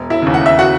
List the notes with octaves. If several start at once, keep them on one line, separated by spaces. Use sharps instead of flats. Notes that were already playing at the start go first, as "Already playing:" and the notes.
Already playing: E1
E4 E5
D#2 C#3
F#5
E5
F#4 F#5